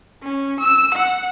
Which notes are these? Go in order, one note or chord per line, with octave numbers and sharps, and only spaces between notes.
C#4
E6
F#5